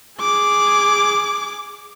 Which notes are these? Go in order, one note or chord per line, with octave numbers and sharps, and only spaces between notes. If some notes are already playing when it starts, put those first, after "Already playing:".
G#4 D6